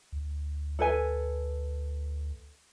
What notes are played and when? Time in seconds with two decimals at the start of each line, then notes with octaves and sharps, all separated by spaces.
0.12 D2
0.79 A4 B4 G#5